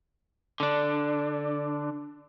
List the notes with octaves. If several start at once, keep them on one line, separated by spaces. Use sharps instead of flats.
D3 D4